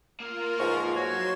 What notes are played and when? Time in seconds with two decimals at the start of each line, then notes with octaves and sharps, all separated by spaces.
0.20 A#3 F4 A#4 F5
0.59 E2 G#2 F3 C#6
0.95 F#3 F#4 C#5 C6 E7